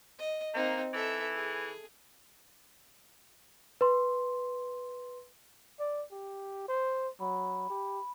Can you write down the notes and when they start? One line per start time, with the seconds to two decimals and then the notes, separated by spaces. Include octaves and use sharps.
0.19 D#5
0.54 A#3 C4 D#4
0.94 E3 A4 E5
1.35 G#4
3.81 B4 C6
5.79 D5
6.11 G4
6.68 C5
7.20 F#3 B5
7.70 G4